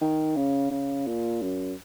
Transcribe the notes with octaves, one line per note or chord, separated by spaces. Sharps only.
D#3
C#3
C#3
A#2
F#2